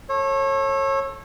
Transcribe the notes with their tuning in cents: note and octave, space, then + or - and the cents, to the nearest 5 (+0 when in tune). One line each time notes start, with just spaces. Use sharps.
A4 +0 C#5 -30